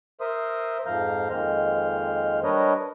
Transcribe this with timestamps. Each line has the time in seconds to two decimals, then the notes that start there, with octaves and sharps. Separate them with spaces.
0.21 A#4 C5 E5 C6 D#6
0.86 F2 G#2 F3 F5 A#5 G6
1.30 F2 D#3 G#3 A#3 C5 F6
2.44 G3 D4 A#4 B4 C#5 D#5